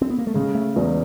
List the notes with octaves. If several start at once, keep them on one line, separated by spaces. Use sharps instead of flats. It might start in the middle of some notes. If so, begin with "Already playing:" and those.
C4
B3
A#3
A3
C#3 G#3
A3
E2 G#3